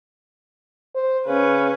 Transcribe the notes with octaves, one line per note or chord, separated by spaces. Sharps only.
C5
C#3 C#4 B4